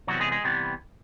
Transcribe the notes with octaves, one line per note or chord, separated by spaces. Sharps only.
C3 E3 F#3 G3 B3 F#4
G#3 G#4
G#3 G#4
C3 E3 G3 B3